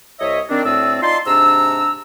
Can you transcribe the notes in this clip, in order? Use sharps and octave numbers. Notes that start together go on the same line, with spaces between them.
C2 C#5 D#5 E5
D#3 C4 D4
D2 A2 C4 D5 D#6 E6
D#4 F4 D5 A5 C6
G#2 C3 D4 A#5 E6